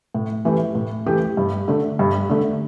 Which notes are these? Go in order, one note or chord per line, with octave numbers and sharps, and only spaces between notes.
A2
E3 A3 G4
A2
E3 A3 G4
G2
D3 A3
G2
D3 A3